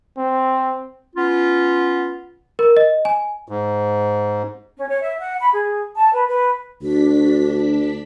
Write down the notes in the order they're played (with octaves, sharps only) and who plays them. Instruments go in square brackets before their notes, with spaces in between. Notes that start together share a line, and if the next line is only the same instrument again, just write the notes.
[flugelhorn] C4
[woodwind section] B3 C#4 F4
[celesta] A#4
D#5
G#5
[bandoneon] G#2
[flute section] C#4
C#5
E5
F#5
B5
G#4
A5
B4
B4
[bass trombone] D2 [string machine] D4 B6 [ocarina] F#4